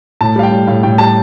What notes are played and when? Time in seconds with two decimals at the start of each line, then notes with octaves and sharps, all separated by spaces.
0.21 A2 A5
0.36 G3 F5
0.43 G5
0.51 G3
0.67 A2 F5
0.83 A2 G5
0.98 G3 A5